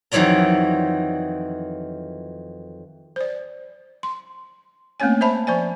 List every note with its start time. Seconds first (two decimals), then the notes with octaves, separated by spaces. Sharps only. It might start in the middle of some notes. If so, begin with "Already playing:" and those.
0.12 F2 D#3 E3 F#3 D5 A#5
3.16 C5 D5
4.03 C6
5.00 A3 A#3 C4 C#4 C#5 G#5
5.21 C5 E5 A5 B5
5.47 F3 C5 D5 G#5